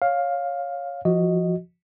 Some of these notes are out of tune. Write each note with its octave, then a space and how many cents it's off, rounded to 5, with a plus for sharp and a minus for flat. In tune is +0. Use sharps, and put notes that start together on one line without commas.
C#5 +0 F5 +10
F3 -15 F#4 +0 D#5 +5